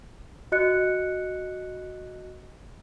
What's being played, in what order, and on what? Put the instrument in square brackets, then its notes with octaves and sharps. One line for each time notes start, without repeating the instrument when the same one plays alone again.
[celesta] F#4 D#5 F#6 C#7